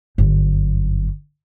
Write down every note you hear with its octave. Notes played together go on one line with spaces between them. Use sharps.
G1 F#2